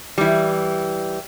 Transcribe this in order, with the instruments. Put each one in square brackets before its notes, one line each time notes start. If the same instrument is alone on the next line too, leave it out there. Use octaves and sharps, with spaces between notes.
[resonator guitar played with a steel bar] E3 G3